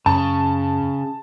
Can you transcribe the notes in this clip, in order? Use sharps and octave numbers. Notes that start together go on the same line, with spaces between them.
F#2 C#3 A5